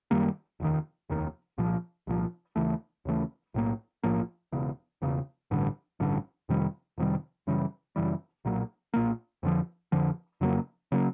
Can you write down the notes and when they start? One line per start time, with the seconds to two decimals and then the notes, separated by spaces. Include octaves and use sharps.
0.11 F#2 D#3 G3 A#3
0.60 F1 D#2 D#3
1.09 F1 D#2 D#3
1.58 C2 A#2 F3
2.07 C2 A#2 F3
2.56 D#2 C#3 E3 A3
3.05 D#2 C#3 E3 A3
3.54 B1 A2 F3 A#3
4.03 B1 A2 F3 A#3
4.52 E1 E2 C#3
5.02 E1 E2 C#3
5.51 A1 G2 D3
6.00 A1 G2 D3
6.49 F2 C3 D#3 G3
6.98 F2 C3 D#3 G3
7.47 F#2 C#3 E3 G3
7.96 F#2 C#3 E3 G3
8.45 B1 A#2 F#3 A#3
8.94 B1 A#2 F#3 A#3
9.43 F2 D3 F3
9.92 F2 D3 F3
10.41 F2 C#3 F#3 A#3
10.92 C#3 F#3 A#3